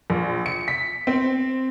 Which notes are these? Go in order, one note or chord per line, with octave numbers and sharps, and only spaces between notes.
A#1
C#7
B6
C4